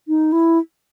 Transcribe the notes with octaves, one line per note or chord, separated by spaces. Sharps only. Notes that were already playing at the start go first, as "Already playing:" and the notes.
D#4
E4